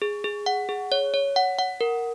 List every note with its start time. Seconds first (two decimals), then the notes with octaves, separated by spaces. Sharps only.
0.02 G#4
0.24 G#4
0.46 F#5
0.69 G#4
0.92 C#5
1.14 C#5
1.36 F#5
1.59 F#5
1.81 A#4